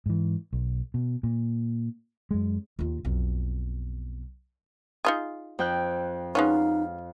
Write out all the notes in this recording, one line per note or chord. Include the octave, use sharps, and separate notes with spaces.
G#2 E3
B1
B2
A#2
F#2 G#3
D#2 F4
B1 F2
D#4 F4 G#4
F2 G5 F#6
G#3 B3 C#4 D#4 F5